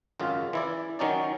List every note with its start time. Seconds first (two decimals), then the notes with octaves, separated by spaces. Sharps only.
0.20 G#1 F#2 C#3 F4
0.53 E3 E4 D5
0.99 D#3 F#3 C#4 D#4 D5